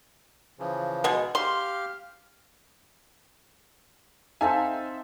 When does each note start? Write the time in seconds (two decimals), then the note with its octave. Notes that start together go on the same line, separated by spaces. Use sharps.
0.59 C#3 E3 F3
1.04 B2 G#3
1.35 G4 F5 C6 F6
4.41 C4 D#4 A4 E5 F5 G#5